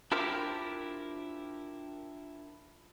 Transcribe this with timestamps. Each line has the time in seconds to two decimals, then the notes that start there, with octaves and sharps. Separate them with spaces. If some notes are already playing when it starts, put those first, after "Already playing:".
0.12 D4 E4 F4 G4 A#4 C5